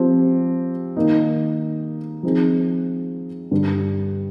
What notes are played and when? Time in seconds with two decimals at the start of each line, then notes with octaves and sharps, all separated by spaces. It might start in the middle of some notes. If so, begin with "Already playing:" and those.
Already playing: F3 C4 G4
0.97 D#3 A#3 D#4
2.23 F3 C4 D#4 G#4
3.51 G2 D3 G3